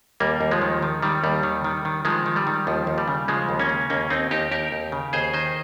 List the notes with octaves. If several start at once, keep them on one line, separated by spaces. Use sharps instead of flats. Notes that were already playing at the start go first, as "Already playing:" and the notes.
D#2 G3 A#3
D#2
F3 G#3
D#3
D#3
D#3 G3
D#2 G3
D#3
D#3
D#3
D#3 F3 G#3
D#3
G3
D#3
D#2 F3
D#2
G3
C#3
C#3 F3 G#3
D#2
A#3 C#4
C#3
D#2 A#3 C#4
D#2 C4 D#4
D#2 D#4 G4
D#2 G4 A#4
D#2
C#3
D#2 G#4 C5
D#3 C5 D#5